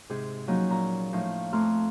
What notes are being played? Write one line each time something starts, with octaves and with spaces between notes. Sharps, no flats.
G#2 C3 G4 G#4
F3 F#3 A#3 C#4 D#4
A#2 A#5 C#6
A2 F3 D#4 F5
F2 A3 A#5 C6 D6 F6